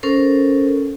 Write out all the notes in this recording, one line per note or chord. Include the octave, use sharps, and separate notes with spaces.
C#4 A4 A#4 C5